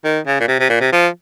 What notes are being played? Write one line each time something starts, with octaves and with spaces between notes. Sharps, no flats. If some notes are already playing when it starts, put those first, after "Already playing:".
D#3
C#3
A#2
C3
C3
A#2
C3
F3